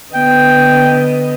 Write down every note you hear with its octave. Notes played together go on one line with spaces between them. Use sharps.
D3 B3 D#5 G5